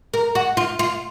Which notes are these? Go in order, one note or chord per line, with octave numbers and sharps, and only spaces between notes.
A#4
F#4
F4
F4